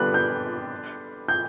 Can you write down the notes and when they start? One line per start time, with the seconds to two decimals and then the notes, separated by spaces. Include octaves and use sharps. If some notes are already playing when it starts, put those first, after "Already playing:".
Already playing: D3 G3 B3 D4 F4 F#6
0.14 G6
1.28 G6